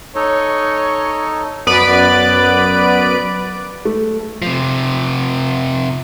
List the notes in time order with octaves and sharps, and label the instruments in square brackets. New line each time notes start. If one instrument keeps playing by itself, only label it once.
[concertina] D#4 A4 D#5 [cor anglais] C#5
[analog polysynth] F#2 B3 B4 D5 B5 D7
[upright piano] A3
[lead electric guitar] C3 F3